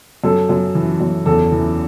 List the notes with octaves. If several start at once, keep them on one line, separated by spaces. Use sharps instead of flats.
F#2 A4
F#2
E3
F#2
E2 A4
E3